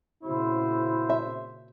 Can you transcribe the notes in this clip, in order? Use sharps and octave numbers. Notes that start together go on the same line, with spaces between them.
A#2 C#3 C4 E4 F#4 C5
E5